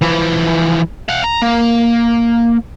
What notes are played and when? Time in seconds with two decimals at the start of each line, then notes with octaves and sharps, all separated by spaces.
0.02 E3 F3
1.09 F5 F#5
1.24 A#5
1.42 A#3